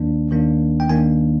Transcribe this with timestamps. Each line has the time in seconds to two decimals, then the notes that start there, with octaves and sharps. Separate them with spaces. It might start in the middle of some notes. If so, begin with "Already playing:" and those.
Already playing: D#2 D#3 A#3 D4
0.31 D#2 D#3 A#3 D4
0.80 G5
0.89 D#2 D#3 A#3 D4 G#5